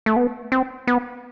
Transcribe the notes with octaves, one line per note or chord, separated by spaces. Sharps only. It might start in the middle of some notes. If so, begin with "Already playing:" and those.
A3
B3
C4
B3